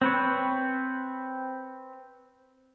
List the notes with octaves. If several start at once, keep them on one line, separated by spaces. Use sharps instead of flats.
C4 B4 C#5